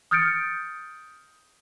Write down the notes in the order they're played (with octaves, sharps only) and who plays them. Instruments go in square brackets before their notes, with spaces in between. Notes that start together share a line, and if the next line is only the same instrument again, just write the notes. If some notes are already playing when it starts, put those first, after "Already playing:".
[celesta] D#6 F6 G6 A6 C#7 D7